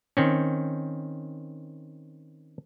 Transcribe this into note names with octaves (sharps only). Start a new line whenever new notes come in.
D#3 C4 C#4